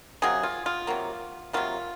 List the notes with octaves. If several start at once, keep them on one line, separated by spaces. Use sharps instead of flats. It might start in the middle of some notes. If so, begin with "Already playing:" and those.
C3 F#3 A#3 G#4
F4
F4
C3 F#3 A#3
C3 F#3 A#3 F4